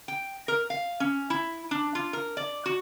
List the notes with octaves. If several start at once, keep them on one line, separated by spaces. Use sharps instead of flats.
G5
A#4
F5
C#4
E4
D4
F4
A#4
D5
F#4